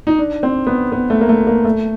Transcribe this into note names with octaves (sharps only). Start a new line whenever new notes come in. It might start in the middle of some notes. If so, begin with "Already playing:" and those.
D#4
D4
C4
B3
B3
A3
A#3
A3
A#3
A3